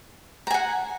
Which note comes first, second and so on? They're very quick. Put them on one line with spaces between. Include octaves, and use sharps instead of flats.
A#5 G#5 F#5